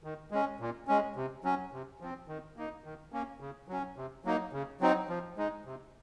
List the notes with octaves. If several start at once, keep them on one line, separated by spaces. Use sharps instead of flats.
D#3
G#3 C#4
A#2
G#3 C#4
C3
F#3 C#4
C3
F3 C4
D#3
A#3 D#4
D#3
A#3 C#4
C#3
F#3 C#4
C3
F#3 A#3 D#4
C#3
F#3 C4 D#4
F3
G#3 D#4
C3